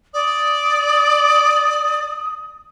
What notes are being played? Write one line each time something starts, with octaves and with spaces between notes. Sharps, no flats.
D5 D#6